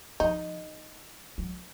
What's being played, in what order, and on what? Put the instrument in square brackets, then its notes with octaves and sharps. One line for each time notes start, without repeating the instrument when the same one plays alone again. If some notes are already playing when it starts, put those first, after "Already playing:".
[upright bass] F3 [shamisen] D#4
[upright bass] F#3